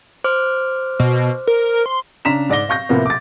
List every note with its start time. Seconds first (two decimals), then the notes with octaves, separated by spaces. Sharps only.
0.24 C5 D6 F6
1.00 B2
1.47 A#4
1.86 C6
2.25 C#3 D4 A#5 B6 E7
2.50 G#2 D5 D6 A#6 G7
2.69 F5 C#6 G6 A#6
2.89 A2 C3 F3 A#3 B3
3.06 D6 A6